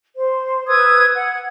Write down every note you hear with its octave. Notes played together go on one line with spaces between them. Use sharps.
C5
B4 D#6 E6 G#6
F#5